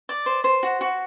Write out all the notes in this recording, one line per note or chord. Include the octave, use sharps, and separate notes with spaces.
D5
C5
C5
F#4
F#4